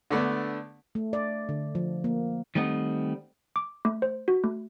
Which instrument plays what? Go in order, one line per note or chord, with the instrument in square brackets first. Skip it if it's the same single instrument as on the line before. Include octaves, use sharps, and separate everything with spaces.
[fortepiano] D3 A3 B3 D4
[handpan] A3
D5
D3
F3
A#3
[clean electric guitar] D#3 G3 A3 C4 D#5 F#5
[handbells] D6
A3
C5
F#4
A3